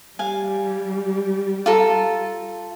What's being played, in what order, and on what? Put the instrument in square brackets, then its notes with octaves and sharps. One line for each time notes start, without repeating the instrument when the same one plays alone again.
[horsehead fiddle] G3 [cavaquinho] F5 G#5
[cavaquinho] F4 A4 A#5